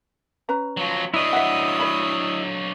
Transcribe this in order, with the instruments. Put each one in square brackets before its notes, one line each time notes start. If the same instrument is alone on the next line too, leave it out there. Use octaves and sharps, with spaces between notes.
[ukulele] C#4 B4 A#5
[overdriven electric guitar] F3 F#3
[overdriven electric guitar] F#3 D4 [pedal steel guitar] E4 D#5 [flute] D#6
[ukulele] E5 F#5
C#5 B5